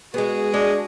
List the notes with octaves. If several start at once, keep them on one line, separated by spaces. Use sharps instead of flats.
G#3 B3 F#4 G#4
G#3 D4